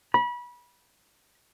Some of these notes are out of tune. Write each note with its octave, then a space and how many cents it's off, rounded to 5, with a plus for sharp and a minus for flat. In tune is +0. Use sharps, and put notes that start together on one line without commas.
B5 -30